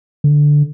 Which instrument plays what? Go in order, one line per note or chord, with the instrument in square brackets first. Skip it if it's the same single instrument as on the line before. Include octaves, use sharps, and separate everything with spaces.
[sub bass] D3